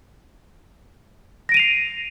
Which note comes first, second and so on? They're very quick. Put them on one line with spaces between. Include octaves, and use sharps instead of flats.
A#6 D7 D#7 F7 C7